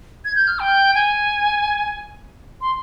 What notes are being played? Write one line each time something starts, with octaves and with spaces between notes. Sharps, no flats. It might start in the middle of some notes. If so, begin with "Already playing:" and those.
G#6
G6
F6
G5
G#5
C6